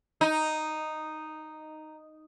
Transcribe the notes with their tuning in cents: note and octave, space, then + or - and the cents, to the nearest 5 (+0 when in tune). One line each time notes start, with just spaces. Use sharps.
D#4 -5